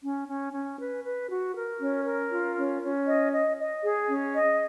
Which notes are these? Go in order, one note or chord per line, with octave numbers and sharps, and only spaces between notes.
C#4
C#4
C#4
B4
B4
F#4
A#4
C#4
A#4
F4
C#4
C#4
D#5
D#5
D#5
G#4
C#4
D#5